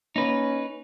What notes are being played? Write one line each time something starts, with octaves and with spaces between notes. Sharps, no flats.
A#3 C#4 D#4 B4